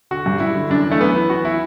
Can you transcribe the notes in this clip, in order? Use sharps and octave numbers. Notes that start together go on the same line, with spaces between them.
D3 F#4
G2
G2 E4
D3
F#2 D4
E3
A3
F#2 B3
E3
E3 F#4
E3 E4